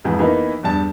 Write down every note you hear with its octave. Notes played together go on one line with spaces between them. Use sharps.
F2 G#2 E3
E3 A#3 B3 D#4
E2 G2 A5